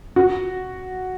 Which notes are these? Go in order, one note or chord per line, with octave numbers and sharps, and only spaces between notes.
F#4